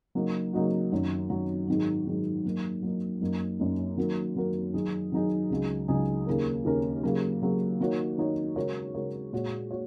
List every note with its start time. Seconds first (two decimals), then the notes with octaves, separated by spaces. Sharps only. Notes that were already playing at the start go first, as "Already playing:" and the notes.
0.15 C#3 F#3 A#3 D#4 F#4
0.53 C#3 F#3 A#3 D#4 F#4
0.92 F#2 D#3 F#3
1.30 F#2 D#3 F#3
1.68 G#2 D#3 F#3
2.06 G#2 D#3 F#3
2.45 F#3 A#3 D#4
2.83 F#3 A#3 D#4
3.21 F#2 F#3 A#3 D#4
3.59 F#2 F#3 A#3 D#4
3.97 D#3 F#3 A#3 F#4 A#4
4.36 D#3 F#3 A#3 F#4 A#4
4.74 D#3 F#3 D#4 G#4
5.12 D#3 F#3 D#4 G#4
5.50 C#2 C#3 F#3 D#4 G#4
5.88 C#2 C#3 F#3 D#4 G#4
6.26 D#2 C#3 A#3 C#4 A#4
6.65 D#2 C#3 A#3 C#4 A#4
7.03 C#3 F#3 A#3
7.42 C#3 F#3 A#3
7.80 D#3 A#3 D#4 F#4 C#5
8.18 D#3 A#3 D#4 F#4 C#5
8.56 C#3 G#3 F#4 A#4 C#5
8.95 C#3 G#3 F#4 A#4 C#5
9.32 A#2 G#3 F#4 C#5
9.71 F#4 C#5